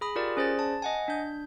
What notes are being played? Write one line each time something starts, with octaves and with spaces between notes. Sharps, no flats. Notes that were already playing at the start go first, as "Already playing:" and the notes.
G#4 B5 D#6
F4 G4 A#4 D5
C#4 G#4 C5 D5 A6
A5
D#5 F#5 G#5
D4 G6